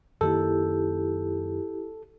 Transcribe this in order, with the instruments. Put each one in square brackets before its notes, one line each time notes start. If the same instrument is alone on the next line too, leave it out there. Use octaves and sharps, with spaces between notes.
[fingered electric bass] F#2 D#3 A#3 [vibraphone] E4 G4 [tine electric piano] A4